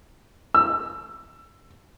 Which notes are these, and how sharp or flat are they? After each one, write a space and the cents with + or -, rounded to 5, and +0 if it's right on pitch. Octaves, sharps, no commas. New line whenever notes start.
E6 +20